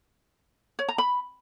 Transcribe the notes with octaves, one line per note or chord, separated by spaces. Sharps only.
C#5
A#5
B5